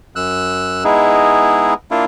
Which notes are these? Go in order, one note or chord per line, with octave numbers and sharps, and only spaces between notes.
F#2 E6 F#6
G#3 B3 D#4 E4 G#4
A#3 D4 E4 F4